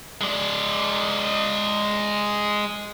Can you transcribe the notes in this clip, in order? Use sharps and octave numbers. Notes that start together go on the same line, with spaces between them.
G#3 D5